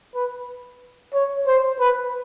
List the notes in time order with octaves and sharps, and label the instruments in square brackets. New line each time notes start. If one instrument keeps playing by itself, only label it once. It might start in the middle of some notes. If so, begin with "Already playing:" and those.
[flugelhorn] B4
C#5
C5
B4